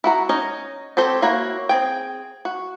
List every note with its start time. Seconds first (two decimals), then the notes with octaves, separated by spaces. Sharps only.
0.04 E4 F#4 A#5
0.29 C#4 D#4 C#5 D#5
0.97 C4 G4 A4 C5 C#5
1.22 A#3 E4 F#4 C#5
1.69 C4 G#4 G5
2.45 F#4